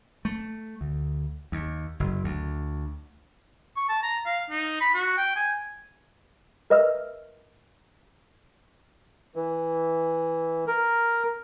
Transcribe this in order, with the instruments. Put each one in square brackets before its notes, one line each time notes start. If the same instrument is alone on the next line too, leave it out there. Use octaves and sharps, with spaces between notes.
[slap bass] A3
D2
D#2
F#1
D2
[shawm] C#6
A5
A#5
F5
D#4
B5
F#4
G5
G#5
[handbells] A#4 B4 D#5 E5 E6 F6
[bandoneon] E3
A#4